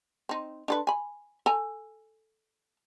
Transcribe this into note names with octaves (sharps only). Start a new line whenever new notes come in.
C4 D#4
D4 A4 B4
G#5 B5
A4 G#5 A#5